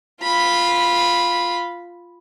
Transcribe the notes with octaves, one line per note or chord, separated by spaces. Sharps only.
F4 B5